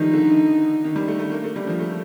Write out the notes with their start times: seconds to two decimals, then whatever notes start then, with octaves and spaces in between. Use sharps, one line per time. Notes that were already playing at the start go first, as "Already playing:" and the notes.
Already playing: D#3 F3 G3 A3 D#4
0.13 D3
0.84 D#3
0.96 G3
1.08 A3
1.19 A3
1.32 A#3
1.44 A3
1.56 G3
1.67 F3
1.79 A3